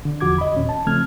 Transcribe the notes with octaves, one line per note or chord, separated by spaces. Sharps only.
D3
E2 F3 F#4 D6 G#6
D#5 B5
D#2 A#2 C#4
A5
C#3 F3 A3 C4 F6 G#6